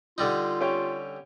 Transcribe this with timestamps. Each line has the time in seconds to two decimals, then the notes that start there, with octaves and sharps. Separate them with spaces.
0.18 D3 G3 D#4 F4
0.61 C#4 G4 C#5